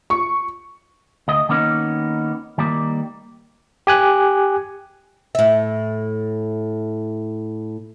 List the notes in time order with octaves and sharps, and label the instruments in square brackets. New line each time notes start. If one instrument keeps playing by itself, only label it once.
[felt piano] C#6
[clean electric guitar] D2 D#5
D#3 A#3 B3 C#4 D#4
D#3 G3 A#3
[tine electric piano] G4 G#5 F#6
[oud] A2 E5